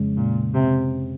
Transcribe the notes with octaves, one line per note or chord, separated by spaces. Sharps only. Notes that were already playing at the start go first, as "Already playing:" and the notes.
Already playing: F2 C#3 G#3 C#4
A#2
C3